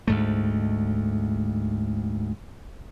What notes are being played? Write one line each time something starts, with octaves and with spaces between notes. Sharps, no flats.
D2 G#2 A3